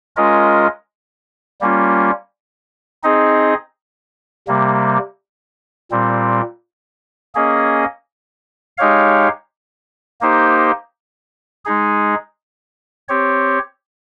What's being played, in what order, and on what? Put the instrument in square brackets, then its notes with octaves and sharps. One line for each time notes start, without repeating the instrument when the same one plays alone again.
[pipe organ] G#3 C#4 F4 A#4 D#5
G3 A#3 C#4 F4
C4 D#4 G#4 D#5
C3 G3 A#3
A#2 G3 C4
A#3 C#4 G#4 D#5
G#3 D#4 G4 C#5 F5
A#3 D#4 G4 C5
G#3 D#4 G#4
C4 G4 C#5